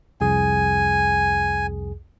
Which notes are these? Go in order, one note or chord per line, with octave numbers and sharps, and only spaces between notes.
C2 F2 G#4 G#5